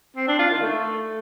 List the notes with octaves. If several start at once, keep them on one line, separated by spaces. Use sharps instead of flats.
C4
D4
F4
D#3
A3